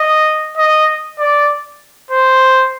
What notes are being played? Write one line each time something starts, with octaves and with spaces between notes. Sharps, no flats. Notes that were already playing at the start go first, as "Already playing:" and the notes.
Already playing: D#5
D#5
D5
C5